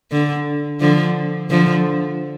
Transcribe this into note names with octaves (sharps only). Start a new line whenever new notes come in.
D3
D3 F3
D3 F3